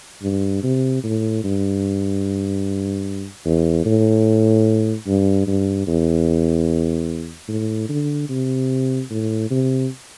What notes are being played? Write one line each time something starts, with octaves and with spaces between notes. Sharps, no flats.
G2
C3
A2
G2
E2
A2
G2
G2
E2
A2
D3
C3
A2
C3